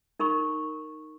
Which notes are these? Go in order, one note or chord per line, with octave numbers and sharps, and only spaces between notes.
D#4 A#4 B5 C#6